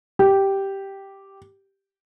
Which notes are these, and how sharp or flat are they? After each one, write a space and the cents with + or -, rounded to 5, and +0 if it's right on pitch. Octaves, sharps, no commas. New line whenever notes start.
G4 -5